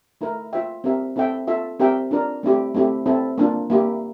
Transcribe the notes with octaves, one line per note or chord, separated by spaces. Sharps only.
A3 E4 A#4
F4 C5 E5 G5
C4 G4 A#4 E5
C4 E4 A4 E5 G5
F4 A4 E5
C4 G4 A#4 E5 G5
D4 F4 A#4 D5
A3 C4 E4 G4
A3 C4 E4 G4
C4 E4 A4
A#3 D4 F4
A#3 E4 G4